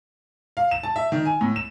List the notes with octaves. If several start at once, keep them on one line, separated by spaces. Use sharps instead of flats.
F5
E7
A5
E5
D#3
G#5
A2
E7